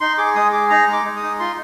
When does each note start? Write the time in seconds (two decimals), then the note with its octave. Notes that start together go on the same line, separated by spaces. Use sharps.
0.01 D#4 C6
0.18 G#4 D6
0.35 G#3 D#6
0.53 G#4 D6
0.70 D#4 A#5
0.88 G#3
0.93 D6
1.05 G#3
1.16 D#6
1.22 D#4
1.39 F4 C6